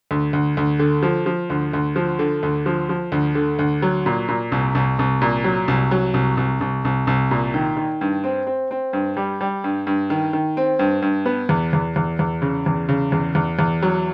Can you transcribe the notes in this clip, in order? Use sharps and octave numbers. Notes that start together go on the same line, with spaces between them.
D2
D2
D2
D3
F3
F3
D2
D2
F3
D3
D2
F3
F3
D2
D3
D2
F#3
A#2
A#2
C2
C2
C2
A#2
F#3
C2
F#3
C2
C2
C2
C2
C2
A#2
D#3
D#3
G2
C4
C4
C4
G2
G3
G3
G2
G2
D#3
D#3
C4
G2
G2
B3
E2
E2
E2
E2
C#3
E2
C#3
E2
E2
E2
F#3